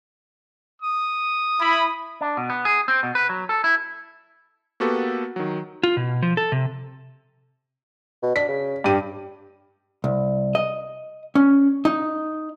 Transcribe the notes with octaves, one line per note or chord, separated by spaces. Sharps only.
D#6
E4 B5
D4
B2
B3
G#4
C4
B2
B4
F#3
A4
E4
A#3 B3 F#4 G4 A4 B4
D#3 F#3
F4
B2
F3
A4
C3
B2
D4 B6
C#3
G2 G4 D#7
C2
D#5
C#4
D#4